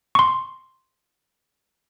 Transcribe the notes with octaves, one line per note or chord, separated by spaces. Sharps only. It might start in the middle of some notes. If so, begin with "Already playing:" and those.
C6 C#6